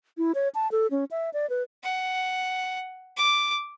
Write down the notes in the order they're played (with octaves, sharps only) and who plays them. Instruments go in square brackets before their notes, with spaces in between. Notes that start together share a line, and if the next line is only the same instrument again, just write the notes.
[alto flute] E4
C#5
A5
A4
C#4
E5
D5
B4
[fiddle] F#5
D6